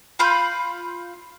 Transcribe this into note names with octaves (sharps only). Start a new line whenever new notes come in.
F4 F5 B5 G6